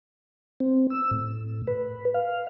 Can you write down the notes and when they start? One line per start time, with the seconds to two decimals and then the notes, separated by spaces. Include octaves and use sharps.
0.60 C4
0.90 E6
1.11 A2
1.67 B4
2.14 F5